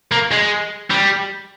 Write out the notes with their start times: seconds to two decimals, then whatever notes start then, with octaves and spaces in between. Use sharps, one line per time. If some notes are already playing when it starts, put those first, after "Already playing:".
0.12 A#3
0.32 G#3
0.91 G3